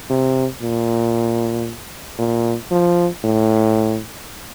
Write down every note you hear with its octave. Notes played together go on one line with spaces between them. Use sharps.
C3
A#2
A#2
F3
A2